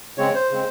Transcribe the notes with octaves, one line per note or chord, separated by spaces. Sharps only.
C#3 G#3 C4 C#5
C5
C#3 G#3 C4